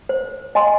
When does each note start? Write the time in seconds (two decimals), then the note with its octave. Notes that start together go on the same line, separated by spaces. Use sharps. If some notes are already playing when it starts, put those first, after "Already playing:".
0.09 C5
0.55 D#5 G#5 C6